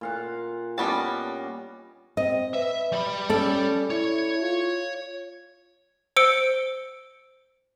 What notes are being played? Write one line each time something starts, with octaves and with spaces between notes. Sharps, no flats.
A#2 F5 F#5
G3 B3 C#4 D4 D#5 A5
C4 D#5
B4 E5
G3 B5
C#4 A4 D5
E4 C#5
F4
C5 E6 C#7 D7 G7